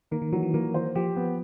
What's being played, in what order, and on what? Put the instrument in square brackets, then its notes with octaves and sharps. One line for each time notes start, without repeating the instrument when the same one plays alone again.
[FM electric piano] D#3 [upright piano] A#3
[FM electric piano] D#3
[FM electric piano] E3 [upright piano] F#3
[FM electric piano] E3
[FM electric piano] E3 [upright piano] A#3
[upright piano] C5
[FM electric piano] F3 [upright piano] G4
[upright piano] B3